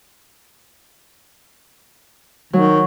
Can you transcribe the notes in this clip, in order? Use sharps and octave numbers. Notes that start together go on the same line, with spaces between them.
D#3 F#3